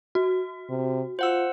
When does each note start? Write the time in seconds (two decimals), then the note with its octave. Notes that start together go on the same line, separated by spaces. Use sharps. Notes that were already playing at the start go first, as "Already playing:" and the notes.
0.15 F#4
0.70 C3
1.19 F4 C5 F#5 E6